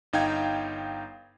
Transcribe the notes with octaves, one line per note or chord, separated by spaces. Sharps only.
G1 D#4 F5 G5 G#6